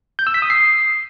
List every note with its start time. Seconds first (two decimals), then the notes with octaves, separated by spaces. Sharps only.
0.19 G6
0.27 E6
0.34 B6
0.42 D#6
0.50 C7